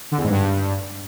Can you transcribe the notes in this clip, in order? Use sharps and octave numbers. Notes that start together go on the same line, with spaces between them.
D3
E2
G#2
G2